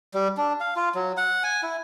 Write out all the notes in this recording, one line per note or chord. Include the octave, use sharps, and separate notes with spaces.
G3
D4
F5
F4
F#3
F#5
G#5
E4